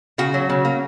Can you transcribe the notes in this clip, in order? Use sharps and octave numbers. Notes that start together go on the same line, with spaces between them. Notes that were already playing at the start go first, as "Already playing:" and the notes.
C#3 F#4
F#3
C#3
A#3